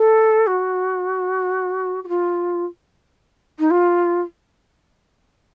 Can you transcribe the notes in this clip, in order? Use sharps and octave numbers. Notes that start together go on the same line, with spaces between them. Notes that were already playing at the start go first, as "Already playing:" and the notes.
Already playing: A4
F#4
F#4
F4
D#4
F4